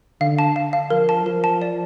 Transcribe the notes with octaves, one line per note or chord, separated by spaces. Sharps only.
D3 F5
A5
F5
F5
F3 A#4
A5
F3 A#4
A5
D5